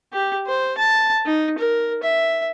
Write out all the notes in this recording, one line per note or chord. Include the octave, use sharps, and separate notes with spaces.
G4
C5
A5
D#4
A#4
E5